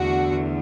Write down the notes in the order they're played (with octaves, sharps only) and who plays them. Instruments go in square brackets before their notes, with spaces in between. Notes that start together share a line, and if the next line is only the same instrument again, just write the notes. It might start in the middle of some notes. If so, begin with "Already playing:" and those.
Already playing: [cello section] E2 D3 A3 F#4